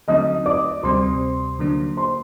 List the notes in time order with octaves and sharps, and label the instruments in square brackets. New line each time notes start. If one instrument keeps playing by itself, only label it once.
[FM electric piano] D3 F#3 A3 C4 D#4 [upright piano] D#5 D#6
[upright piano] D5 D6
[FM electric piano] D2 C3 G3 C4 [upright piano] C5 C6
[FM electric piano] D3 F#3 A#3 D4
[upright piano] C5 C6